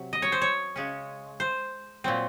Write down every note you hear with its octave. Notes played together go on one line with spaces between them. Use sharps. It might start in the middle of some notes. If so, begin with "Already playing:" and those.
Already playing: C3 F#3
D#5
C#5
C5
C#5
C#3 G#3 C#4
C5
A#2 F#3 C4